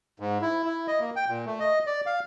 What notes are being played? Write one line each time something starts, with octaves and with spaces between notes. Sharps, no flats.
G#2
E4
E4
D#5
A#3
G5
A#2
A3
D#5
D5
F5